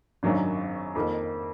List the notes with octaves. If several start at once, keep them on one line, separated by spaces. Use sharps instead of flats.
G#1 F#2 D#3 F#3 D4
F2 D#3 A#3